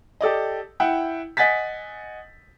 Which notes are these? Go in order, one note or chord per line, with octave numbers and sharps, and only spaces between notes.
G4 A4 D5 D#5
E4 F#5 G5
D#5 F#5 G#5 A6 B6